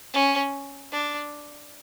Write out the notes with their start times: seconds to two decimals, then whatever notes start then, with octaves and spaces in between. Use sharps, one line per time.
0.14 C#4
0.92 D4